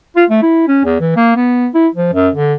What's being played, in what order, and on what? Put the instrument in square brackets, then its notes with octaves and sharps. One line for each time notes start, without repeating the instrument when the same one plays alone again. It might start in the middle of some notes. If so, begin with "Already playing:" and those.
[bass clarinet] F4
A3
E4
C#4
E2
E3
A#3
B3
E4
F3
F#2
D3